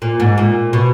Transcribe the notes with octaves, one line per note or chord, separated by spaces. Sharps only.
A#2
G#2
A#2
B2